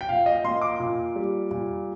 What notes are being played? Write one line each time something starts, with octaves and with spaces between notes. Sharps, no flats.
G5
A#2 F5
D#5
A#3 C6
D6
A#2
G3
A#2